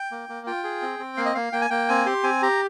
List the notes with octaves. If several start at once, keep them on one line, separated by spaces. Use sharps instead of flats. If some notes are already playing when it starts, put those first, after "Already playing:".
Already playing: G5
A#3
A#3
F4 G5
G#4
C4
C4
A#3 F5
D#5
A#3 F5
A#3 G5
G#5
A#3 G5
C4 G#5
G4 C6
C4 G#5
G4 A#5